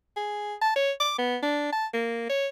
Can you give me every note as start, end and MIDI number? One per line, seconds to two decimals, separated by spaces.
0.17 0.55 68
0.62 0.71 81
0.76 0.92 73
1.00 1.14 86
1.19 1.37 59
1.43 1.71 62
1.73 1.87 81
1.94 2.28 58
2.30 2.48 73